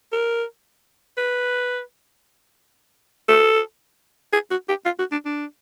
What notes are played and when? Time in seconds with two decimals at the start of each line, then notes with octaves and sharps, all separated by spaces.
0.12 A#4
1.17 B4
3.28 A4
4.33 G#4
4.51 F#4
4.69 G4
4.85 F4
4.99 F#4
5.12 D4
5.25 D4